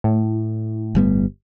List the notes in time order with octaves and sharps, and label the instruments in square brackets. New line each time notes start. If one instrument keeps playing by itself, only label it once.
[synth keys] A2
[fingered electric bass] G1 G3 B3